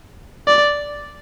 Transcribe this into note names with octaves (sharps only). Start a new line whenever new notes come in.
D5